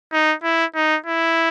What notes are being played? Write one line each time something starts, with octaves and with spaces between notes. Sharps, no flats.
D#4
E4
D#4
E4